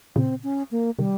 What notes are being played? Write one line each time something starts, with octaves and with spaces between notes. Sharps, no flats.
A#2 C#3 C4
C#4
A#3
C3 D#3 G3